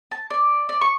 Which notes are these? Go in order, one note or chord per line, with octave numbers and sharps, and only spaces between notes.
A5
D5
D5
C#6